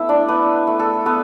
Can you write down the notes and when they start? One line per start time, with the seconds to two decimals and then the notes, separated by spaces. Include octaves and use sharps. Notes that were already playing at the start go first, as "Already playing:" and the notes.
Already playing: A3 B3 E4 E5
0.09 D4 D5
0.28 B3 D4 B4
0.67 A3
0.79 A4
1.05 A3 B3 B4